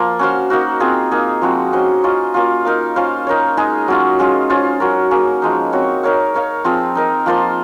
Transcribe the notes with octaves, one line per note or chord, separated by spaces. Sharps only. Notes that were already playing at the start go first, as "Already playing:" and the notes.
Already playing: F3 A#3 F4
C#4 F#4 C5 F5
A#3 D#4 F#4
C4 F4 G#4
A#3 D#4 G#4
F3 G#3 C4 F#4
C#4 F#4 C5 D#5
C#4 F4 C5 D#5
A#3 C#4 F4
D#4 A#4 F5
C#4 F4 C5 F5
D#4 A#4 C#5
G#3 D#4 G#4 D#5
F#3 C#4 F4
G#3 C#4 F4 G#4
C#4 F4 C5
F#3 C#4 F#4 A#4
A#3 C#4 G#4
F3 G#3 D#4
C4 F#4 C#5
D#4 A#4 C#5 F5
D#4 A#4 C#5 F5
F3 C4 F4 G#4
D#4 A#4 D#5
F3 A#3 F4 C5